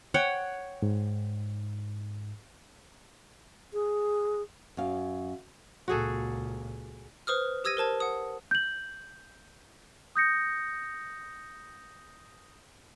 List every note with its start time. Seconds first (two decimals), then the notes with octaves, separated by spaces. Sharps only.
0.14 C#5 F#5 G5
0.82 G#2
3.73 G#4
4.77 F#2 F5
5.88 C#2 A#2 F#4 G#4 A4
7.27 B4 C5 D#6 F6
7.64 G4 D#6 E6 G#6 A#6 D#7
7.77 A#4 C5 A5 G#6
8.00 F#5 D#6
8.51 G6 F#7
10.16 D#6 G6 A#6 C#7